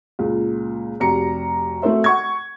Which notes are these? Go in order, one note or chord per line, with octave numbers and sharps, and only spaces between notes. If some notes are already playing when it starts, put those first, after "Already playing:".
C#2 A#2
F1 F#4 G4 A#5 C#7
A3 C4 F#4 A4 C5 E5
F#5 C#6 G#6